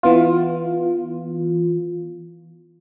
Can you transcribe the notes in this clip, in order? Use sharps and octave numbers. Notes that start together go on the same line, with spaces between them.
E3 B3 F4